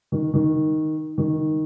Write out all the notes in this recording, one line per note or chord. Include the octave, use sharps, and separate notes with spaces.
D#3
D#3
D#3